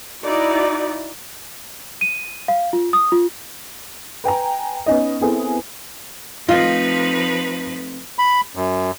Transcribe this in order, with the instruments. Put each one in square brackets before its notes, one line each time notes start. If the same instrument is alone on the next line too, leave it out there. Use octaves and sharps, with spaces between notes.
[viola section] D#4 E4 F#4 D5
[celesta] D#7
F5
F4
D#6
F4
[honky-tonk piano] B4 G5 G#5 A#5
B3 C#4 D#4 D#5
B3 C4 E4 G#4 A4
[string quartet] F3 D#4 B4 [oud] A3 C4 D#5 [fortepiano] F4
[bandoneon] B5
F#2